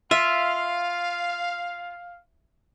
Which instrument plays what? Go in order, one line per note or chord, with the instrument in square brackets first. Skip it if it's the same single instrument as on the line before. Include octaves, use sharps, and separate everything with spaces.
[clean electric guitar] F4 [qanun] E5 [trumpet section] F5